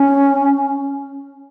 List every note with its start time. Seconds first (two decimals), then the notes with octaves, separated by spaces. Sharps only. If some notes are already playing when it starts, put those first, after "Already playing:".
Already playing: C#4